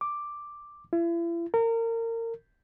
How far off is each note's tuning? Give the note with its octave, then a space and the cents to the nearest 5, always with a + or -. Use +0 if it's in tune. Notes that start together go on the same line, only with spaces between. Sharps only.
D6 +5
E4 +40
A#4 -30